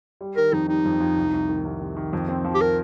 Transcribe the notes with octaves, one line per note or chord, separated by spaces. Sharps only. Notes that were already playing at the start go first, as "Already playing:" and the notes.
G3
D#3 A#4
F2 D#4
G3 D#4
F2
F2
C2
C2
D#3
C2
C3
D#3
F2
C4
F3
G4
A#4